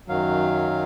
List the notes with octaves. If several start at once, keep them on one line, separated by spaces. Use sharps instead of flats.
F#2 D#3 F#3 F5